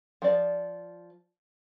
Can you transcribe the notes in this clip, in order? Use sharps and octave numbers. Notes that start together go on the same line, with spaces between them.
F3 D5